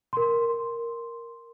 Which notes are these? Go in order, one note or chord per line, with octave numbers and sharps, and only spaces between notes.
A#4 C6